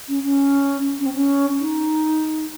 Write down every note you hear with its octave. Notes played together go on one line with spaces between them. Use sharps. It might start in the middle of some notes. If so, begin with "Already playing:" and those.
C#4
C#4
C#4
C4
C#4
D#4